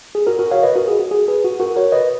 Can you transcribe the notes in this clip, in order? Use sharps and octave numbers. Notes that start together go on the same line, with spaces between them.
G#4
F#4 A#4
F#4 A#4
C#5 F5
B4 D#5
F#4 A#4
G#4
F#4
G#4
G#4 B4
F#4
F#4 A#4
A#4 C#5
B4 D#5